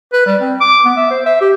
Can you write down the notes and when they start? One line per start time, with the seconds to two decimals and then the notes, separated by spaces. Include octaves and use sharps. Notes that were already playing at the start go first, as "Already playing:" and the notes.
0.13 B4
0.26 G3
0.41 C4
0.61 D6
0.85 B3
0.96 E5
1.10 C5
1.26 E5
1.41 G4